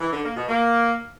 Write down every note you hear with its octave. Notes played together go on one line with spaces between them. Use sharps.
E3
D3
A#3
B2
A#3